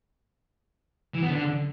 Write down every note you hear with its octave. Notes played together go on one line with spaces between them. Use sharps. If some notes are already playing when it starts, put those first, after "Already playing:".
E3
B3
D3